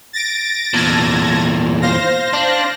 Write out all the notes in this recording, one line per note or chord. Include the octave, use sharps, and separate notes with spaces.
A6 A#6 D7
E2 A#2 A5 G#6 A#6
C5 F5 A#6
D4